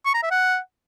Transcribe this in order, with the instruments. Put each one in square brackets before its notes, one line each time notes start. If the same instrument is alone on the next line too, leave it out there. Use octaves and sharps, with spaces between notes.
[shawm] C#6
A#5
E5
F#5